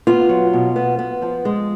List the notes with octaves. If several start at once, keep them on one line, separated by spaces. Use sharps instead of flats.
B3 F4
F#3
B2
B3
B3
F3
G#3